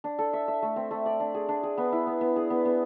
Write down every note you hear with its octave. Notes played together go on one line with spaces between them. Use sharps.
D4
A4
E5
E5
A3
C4
A3
D5
D4
G#4
D4
G#4
B3
E4
B3
B3
G#4
B3
B3